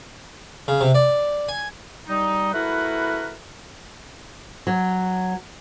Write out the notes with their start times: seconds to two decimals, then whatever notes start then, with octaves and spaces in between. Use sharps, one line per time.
0.68 C#3
0.81 C3
0.95 D5
1.48 G#5
2.08 G3 D#4
2.53 A3 E4 F#4 A#4 B4
4.67 F#3